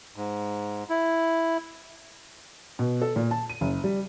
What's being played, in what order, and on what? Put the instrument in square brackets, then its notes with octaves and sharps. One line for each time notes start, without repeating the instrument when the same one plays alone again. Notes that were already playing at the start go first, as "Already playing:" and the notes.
[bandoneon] G#2
E4
[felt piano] B2
A4
A#2
A5
D#7
F#1
G3